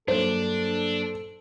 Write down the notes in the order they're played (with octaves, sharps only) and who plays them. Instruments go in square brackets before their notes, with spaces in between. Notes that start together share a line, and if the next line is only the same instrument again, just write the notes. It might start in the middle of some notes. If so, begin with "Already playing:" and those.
[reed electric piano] G2 F#3 A#3 [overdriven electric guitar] D4 [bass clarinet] A4 [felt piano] C5